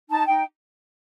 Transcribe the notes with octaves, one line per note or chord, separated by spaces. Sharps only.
D#4 A5
D#4 G5